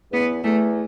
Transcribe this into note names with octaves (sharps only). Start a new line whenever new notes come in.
E2 B3
E2 A3